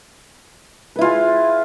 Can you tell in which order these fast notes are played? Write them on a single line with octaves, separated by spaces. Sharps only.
B4 E4 F4 G#4